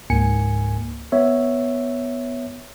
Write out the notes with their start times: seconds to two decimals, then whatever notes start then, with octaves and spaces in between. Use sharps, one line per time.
0.10 C#2 G#2 A#3 G#5 C#7
1.12 B3 C#5 E5